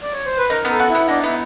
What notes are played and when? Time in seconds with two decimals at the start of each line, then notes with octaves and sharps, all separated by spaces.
0.01 D5
0.13 C#5
0.26 C5
0.37 B4
0.50 D#4 A#4
0.65 B3
0.70 A4
0.80 F#4
0.89 E4
0.95 B3
1.08 D4 D#4
1.23 B3 E4